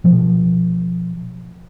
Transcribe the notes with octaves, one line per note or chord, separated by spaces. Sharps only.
B2 F3